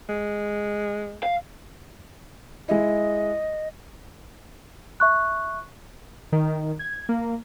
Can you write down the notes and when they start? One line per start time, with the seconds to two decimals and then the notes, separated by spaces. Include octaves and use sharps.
0.09 G#3
1.23 F5
2.68 G#3 E4 D#5
5.00 E5 C#6 F#6
6.32 D#3
6.79 G#6
7.09 A#3